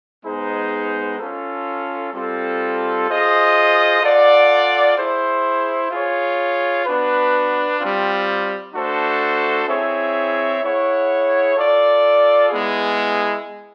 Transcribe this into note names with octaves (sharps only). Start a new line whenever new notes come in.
G#3 B3 D#4 G#4 C5
C#4 F4 A4
G3 C4 F4 A4
F4 G#4 C5 D#5
F4 A4 D5 F#5
E4 G#4 C5
F4 G#4 C#5
B3 D4 F#4 B4
G3 C4 F4
A3 D4 F#4 A4 C5
C4 E4 G#4 C#5 E5
E4 G#4 C#5 F#5
F4 A4 D5
G#3 B3 E4 G#4